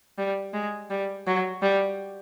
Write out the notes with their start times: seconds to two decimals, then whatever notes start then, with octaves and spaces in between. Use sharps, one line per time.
0.18 G3
0.54 G#3
0.90 G3
1.27 F#3
1.62 G3